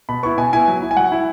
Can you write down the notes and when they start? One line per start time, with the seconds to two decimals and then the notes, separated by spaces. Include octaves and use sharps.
0.09 B2 B5
0.23 B3 E4 C#6
0.38 B2 G#5
0.53 B3 E4 G#5
0.68 F#3
0.82 E4
0.91 G#5
0.97 F#3 F#5
1.12 E4